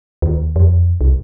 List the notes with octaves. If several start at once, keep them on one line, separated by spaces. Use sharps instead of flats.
D#2
F2
C2